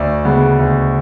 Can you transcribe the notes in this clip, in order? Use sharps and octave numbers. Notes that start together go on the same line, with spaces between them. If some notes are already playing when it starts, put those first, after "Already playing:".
Already playing: D2 D5
C#3 G#3 B3
D2